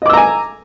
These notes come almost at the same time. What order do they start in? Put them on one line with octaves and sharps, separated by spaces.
D#5 D6 E6 A#5 G#5